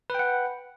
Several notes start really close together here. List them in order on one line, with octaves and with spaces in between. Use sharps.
B4 G5 F#5